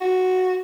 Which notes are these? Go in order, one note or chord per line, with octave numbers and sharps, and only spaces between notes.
F#4